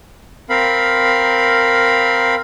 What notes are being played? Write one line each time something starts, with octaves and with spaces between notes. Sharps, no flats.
C4 A#4 F5 B5